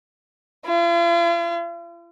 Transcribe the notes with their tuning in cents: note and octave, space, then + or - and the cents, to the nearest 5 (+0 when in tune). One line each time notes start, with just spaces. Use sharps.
F4 -45